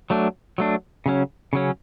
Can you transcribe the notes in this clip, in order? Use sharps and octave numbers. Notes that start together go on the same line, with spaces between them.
F#3 A3 D4
F#3 A3 D4
C#3 F#3 C#4
C#3 F#3 C#4